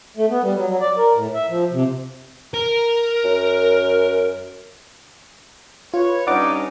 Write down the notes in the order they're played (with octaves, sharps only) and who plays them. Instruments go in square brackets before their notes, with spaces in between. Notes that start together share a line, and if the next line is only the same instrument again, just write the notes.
[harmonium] A3
B3
G3
F#3
F#3
D5
A#4
A2
E5
F3
C3
[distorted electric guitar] A#4
[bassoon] F#2
[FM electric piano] F4 [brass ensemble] B4 C#5
[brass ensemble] G2 C#4 D#4 [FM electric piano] D5 F#5 D6